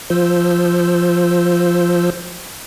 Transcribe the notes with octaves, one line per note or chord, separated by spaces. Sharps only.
F3 F4 C5 E6 G6